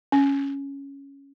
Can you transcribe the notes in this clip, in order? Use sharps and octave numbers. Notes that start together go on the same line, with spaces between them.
C#4